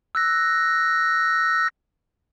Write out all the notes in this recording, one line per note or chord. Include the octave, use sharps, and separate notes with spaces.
E6 F#6 A#6